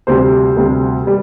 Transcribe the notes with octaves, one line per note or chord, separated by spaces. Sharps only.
D2 C3 G3 C5
D2 C3 G3
G3